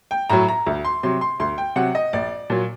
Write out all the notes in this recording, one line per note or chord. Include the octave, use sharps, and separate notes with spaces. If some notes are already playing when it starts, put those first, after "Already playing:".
G5
A2 F#3 A#5
A#5
D2
C6
C3 F#3 C6
C6
D2 C6
G5
C3 F#3 F#5
D#5
A#1 D5
A#2 F#3